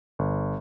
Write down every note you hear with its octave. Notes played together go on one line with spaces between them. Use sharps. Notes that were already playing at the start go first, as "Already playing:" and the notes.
G1